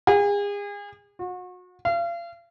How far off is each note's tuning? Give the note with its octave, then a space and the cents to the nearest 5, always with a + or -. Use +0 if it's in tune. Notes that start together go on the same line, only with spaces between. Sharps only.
G#4 -35
F#4 -35
F5 -35